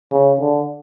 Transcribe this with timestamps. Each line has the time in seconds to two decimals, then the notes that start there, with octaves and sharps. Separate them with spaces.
0.12 C#3
0.41 D3